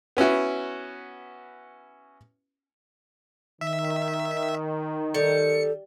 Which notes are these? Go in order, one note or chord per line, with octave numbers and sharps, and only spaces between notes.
B3 C#4 E4 F#4
D#3 E5
G3 A4 C#7